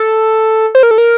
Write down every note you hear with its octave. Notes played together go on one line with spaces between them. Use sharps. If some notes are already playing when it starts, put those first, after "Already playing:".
Already playing: A4
C5
A#4
A4
A#4